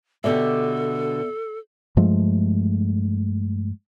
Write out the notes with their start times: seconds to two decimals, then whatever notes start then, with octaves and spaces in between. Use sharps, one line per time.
0.24 B2 D3 B3 G4 A4 D5 E5
1.97 G2 F3 G#3 A3